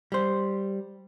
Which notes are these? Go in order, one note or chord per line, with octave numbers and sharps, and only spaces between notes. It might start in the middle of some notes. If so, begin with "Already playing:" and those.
G3 C5